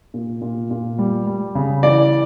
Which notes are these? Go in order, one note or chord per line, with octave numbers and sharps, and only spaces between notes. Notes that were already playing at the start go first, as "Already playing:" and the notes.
A#2
A#2
A#2
G3
G3
C#3
E3 D5